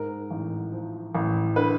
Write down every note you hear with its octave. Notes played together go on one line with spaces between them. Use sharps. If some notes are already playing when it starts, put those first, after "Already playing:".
Already playing: G#2 A#4
A1
F3
A1
D3 B4